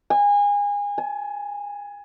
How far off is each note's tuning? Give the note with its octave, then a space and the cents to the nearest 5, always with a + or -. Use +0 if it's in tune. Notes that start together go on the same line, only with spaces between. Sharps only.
G#5 -30
G#5 +40